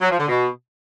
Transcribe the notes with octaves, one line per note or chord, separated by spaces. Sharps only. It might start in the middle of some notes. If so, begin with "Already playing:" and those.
F#3
F3
D3
B2